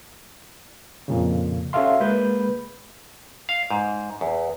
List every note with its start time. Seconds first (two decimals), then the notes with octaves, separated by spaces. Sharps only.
1.08 F2 A#2 C#3
1.73 C#4 F#4 A4 E5 F5 C6
2.00 G#3 A#3 B4 B5 G6
3.49 F5
3.70 G#2
4.21 E2